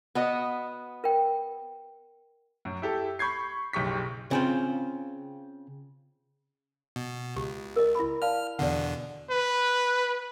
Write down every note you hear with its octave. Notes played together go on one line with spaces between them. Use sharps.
B3 F#4 D#5
A#4 G5
F#2
E4 G4 A4
B5 C#6 G6 G#6 C7
F#1 B1 G4 C#6 B6
C#3 C4 F4
B2
C#2 G4
A#4 D#5
E4 B5
D5 F5 A5 F6
E2 B2 D3 D5 F#5
B4